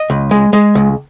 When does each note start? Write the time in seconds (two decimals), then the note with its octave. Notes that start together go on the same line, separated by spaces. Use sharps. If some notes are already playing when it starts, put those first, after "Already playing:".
Already playing: D#5
0.10 C#2
0.31 G#3
0.53 G#3
0.75 C#2